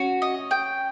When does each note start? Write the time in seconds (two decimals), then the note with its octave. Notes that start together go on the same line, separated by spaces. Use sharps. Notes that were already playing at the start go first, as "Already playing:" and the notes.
Already playing: C#4 F#4
0.22 D#5
0.51 G5